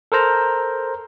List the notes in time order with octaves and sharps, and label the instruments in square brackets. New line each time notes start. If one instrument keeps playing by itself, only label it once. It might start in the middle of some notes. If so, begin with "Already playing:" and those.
[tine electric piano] A4 A#4 C5 A#5